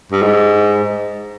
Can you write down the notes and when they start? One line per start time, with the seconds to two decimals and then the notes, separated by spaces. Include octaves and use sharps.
0.12 G2
0.22 G#2